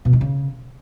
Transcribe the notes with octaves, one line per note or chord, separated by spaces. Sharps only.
B2
D#3
C#3